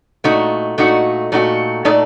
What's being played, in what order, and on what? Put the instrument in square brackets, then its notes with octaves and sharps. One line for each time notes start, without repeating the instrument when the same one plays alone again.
[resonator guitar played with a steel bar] A#2 A3 D#4 F#4
A#2 A3 D#4 F#4
A#2 A3 D#4 F#4
A#2 A3 D#4 A4 D5